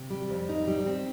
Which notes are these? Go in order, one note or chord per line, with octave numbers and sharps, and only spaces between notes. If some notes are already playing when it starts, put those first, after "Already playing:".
Already playing: C3
G3
F2
D#4
G3
C4